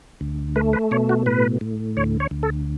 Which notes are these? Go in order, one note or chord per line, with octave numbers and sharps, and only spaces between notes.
D2
A3 B4
B4
B2 C#5
F#4
A2 B4
A2
D2 C#5
C#5
D2
A4